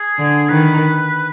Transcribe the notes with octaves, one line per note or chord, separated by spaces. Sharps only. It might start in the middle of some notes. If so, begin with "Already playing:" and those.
Already playing: G#4
D3
D#3 B4